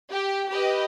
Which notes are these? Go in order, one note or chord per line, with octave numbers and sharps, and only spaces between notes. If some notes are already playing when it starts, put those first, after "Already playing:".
G4
G4 B4 D#5